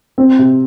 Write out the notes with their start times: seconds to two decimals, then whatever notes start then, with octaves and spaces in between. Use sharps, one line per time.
0.18 C4
0.39 C3